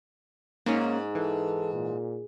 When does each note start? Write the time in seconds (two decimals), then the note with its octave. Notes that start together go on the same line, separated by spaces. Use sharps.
0.66 G#2 A#3 C#4
1.15 E3 A4
1.73 A#2